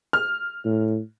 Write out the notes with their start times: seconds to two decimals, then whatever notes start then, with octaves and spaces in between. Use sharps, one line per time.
0.13 F6
0.65 A2